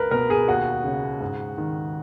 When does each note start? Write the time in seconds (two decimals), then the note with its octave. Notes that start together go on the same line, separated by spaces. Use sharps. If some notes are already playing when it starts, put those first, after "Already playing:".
Already playing: C#2 A#4 B4
0.11 B2 A#4
0.30 G#4
0.48 D#2 F#4
0.84 C#3
1.21 G#2
1.58 D#3